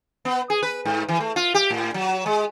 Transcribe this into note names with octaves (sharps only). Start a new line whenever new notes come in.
B3
G#4
B4
G#2
E3
A3
F4
G4
A2
F#3
G#3